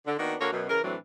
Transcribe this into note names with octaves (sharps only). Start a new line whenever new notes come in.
D3
D#3 A#3 B3 D4 F#4
D3 A#3 F#4 A#4 C#5
F#2 B2
C#3 E3 A#4
A2 E3 F#3 C4 D4